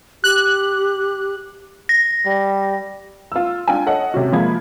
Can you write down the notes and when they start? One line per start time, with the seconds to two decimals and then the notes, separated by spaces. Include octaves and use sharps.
0.24 G4 F#6
1.89 A#6
2.26 G3
3.32 F4 E6
3.68 D4 F4 G5 G#5
3.86 A4 C#5 D#5 F#5
4.14 C3 C#4 F#4
4.32 F3 G#3 A#3 F4 B5 G#6